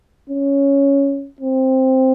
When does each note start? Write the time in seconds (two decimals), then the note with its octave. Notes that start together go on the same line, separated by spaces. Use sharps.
0.30 C#4
1.40 C4